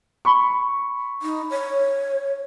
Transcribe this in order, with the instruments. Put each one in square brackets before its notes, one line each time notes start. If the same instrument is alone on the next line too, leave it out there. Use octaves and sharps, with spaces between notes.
[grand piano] B5 C#6
[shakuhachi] D#4
C#5